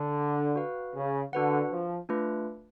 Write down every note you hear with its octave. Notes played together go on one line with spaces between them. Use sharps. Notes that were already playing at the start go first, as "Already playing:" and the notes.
Already playing: D3
F#4 B4 F5
C#3
D3 D4 F#4 B4 F#5
F3
A3 D4 F4 B4